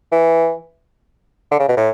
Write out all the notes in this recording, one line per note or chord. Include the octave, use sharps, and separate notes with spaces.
E3
D3
C#3
B2
A2